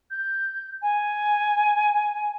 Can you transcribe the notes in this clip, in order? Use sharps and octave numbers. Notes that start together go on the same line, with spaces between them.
G6
G#5